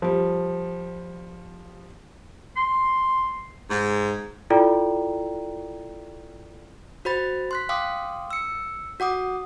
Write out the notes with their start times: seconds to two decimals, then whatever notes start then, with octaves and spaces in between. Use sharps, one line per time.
0.02 F3 G3
2.57 C6
3.70 G#2
4.50 E4 F4 A4 D5 G5 A#5
7.05 F#4 C5 B5 A6
7.51 C6 F#6 B6
7.69 F5 G5 C6 D6 D#6
8.31 E6 C#7
9.00 F#4 F#5 D6 D#6